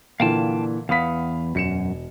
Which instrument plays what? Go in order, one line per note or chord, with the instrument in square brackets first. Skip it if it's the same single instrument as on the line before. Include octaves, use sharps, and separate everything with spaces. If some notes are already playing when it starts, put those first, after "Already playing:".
[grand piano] A#2 D3 E3 [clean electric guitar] F5 G5 A5
[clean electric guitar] E2 B3 [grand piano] F5 D#6 B6
[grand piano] E1 C#7 E7 [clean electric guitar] F#2